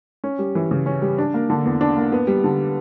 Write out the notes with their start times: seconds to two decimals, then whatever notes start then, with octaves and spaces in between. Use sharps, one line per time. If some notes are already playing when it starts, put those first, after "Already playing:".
0.24 C#4
0.39 G3
0.55 E3
0.71 C#3
0.86 C#4
1.02 G3
1.18 D4
1.34 A#3
1.50 D3
1.65 E2
1.81 D4
1.97 A#3
2.12 B3
2.27 G3
2.44 D3